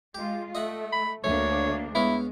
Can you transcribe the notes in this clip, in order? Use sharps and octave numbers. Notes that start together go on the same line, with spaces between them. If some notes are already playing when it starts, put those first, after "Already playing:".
G#3 F4 G4
A3 D#5 E5 F#5
B5
D2 A3 A#3 D4 C#5
G#3 B3 E4 C#5 F5